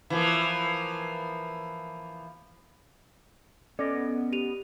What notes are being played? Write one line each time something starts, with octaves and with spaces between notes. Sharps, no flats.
E3 F3 A#3
B3 C#4 A4 D5 D#5
G4 D#7 F7